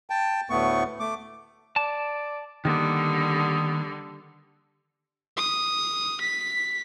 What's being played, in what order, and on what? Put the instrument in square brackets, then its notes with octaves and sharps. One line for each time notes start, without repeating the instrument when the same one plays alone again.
[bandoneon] G5 A5
D2 A2 A3 B3 C#6
A3 D6
[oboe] D5 [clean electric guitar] A5
[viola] D3 G3 [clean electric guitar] D#3 A#3 B3 [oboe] D#6
[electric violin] D#6
B6